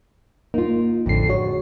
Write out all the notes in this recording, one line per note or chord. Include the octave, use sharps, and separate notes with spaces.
A#3 D#4 F4
A1 F2 D3 C7
G#3 F#4 C#5